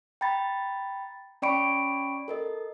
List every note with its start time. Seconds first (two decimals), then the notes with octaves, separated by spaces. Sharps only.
0.21 G5 A#5 B5 A6
1.42 C#4 D5 G5 B5 C#6 D7
2.28 A4 A#4 D#5